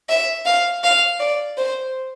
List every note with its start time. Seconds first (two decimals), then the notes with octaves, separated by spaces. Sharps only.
0.09 E5
0.46 F5
0.84 F5
1.20 D5
1.58 C5